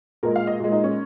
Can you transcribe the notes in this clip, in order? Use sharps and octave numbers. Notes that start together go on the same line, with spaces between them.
A#2 G#3 A#4
F5
D#5
A#2 G#3
D#4
C#4